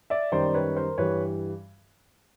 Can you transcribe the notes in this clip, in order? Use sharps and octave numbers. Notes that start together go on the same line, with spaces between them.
D5 E5
F#2 D#3 G3 C5 D5
B4 C#5
A#4 C5
G2 E3 G3 B4 C#5